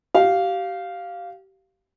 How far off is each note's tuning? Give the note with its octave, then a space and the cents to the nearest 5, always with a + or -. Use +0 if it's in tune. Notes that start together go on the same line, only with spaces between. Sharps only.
G4 -30 F5 +0